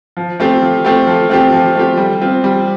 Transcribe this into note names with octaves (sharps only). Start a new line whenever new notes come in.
F3
A3 C4 G4
F3
A3 C4 G4
F3
A3 C4 G4
F3
A3 C4 G4
G3
C4 F4
G3